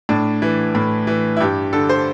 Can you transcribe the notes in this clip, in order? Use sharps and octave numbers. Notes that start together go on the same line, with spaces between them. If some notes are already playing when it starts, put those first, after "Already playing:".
A2 D4
E3
A2
E3
E4
G2 G4
D3 A4
C5